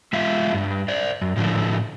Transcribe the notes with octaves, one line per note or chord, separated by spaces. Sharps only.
G#3 F4 E5 F5
G2 G3
C5 D5
F#2
A2 D3 F3 A3 E4